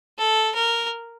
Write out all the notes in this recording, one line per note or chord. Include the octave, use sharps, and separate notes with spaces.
A4
A#4